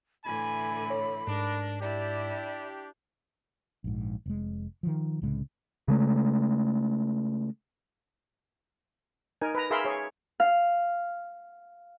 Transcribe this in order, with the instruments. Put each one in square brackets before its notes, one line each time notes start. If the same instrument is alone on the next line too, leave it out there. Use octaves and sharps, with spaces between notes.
[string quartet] A2 D3 E3 [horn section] G#5 [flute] B5
[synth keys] C#5
[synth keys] G#2 [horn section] D4 [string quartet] A#4
[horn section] D4 G4 [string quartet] E4 [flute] D5
[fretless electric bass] A#1 G#2
F1 G#3
D#3 F3
C2 A2 C#3 G#3
[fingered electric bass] C#3 G#3 A3
[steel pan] D#4 A#4 G#5
B4 A#5
G#4 A#4 E5 F5 B5 C6
G#4 C#5
[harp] F5